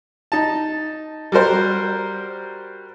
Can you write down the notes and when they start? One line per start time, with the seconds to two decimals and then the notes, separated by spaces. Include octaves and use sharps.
0.32 D#4 A5
1.32 G3 F#4 A#4 C5